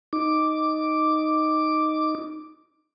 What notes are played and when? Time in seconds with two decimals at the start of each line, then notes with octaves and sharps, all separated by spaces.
0.13 D#4 D6